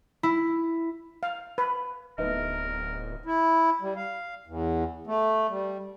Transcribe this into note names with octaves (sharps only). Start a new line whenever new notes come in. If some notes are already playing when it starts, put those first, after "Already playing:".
E4
F5
B4
D1 A3 B3 D#4 A#4
E4
G3
F5
E2
A3
G3